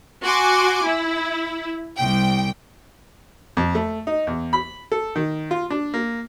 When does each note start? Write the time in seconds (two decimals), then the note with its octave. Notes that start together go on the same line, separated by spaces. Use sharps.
0.22 F#4 G#5 C6 D6
0.85 E4
1.97 C2 G5
3.57 F2
3.75 A3
4.07 D#4
4.27 E2
4.53 B5
4.92 A4
5.16 D#3
5.51 F4
5.70 D4
5.94 A#3